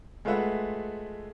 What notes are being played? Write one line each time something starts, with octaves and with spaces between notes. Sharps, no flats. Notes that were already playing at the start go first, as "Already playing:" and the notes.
G#3 A3 F4 B4 E5 F#5